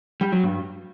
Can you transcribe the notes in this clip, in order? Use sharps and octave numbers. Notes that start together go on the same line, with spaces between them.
G3
F#3
G2